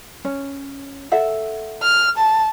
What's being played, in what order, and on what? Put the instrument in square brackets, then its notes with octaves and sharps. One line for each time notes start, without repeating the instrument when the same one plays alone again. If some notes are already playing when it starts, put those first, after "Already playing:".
[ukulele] C#4
A4 E5 F#5
[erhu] F6
A5